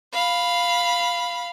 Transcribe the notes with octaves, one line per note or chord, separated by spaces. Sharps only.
F5 B5